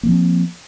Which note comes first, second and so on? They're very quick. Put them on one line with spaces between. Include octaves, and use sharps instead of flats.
A#3 F3 C4